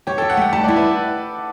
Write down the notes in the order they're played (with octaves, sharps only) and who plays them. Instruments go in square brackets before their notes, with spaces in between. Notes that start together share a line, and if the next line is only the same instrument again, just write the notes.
[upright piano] G4 [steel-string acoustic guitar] C#5
[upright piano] A4
[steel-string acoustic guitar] G4
[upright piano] F#5
[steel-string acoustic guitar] A3 [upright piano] G5
[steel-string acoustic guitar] G3 [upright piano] A5
[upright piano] D5
[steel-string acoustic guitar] E4
[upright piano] B4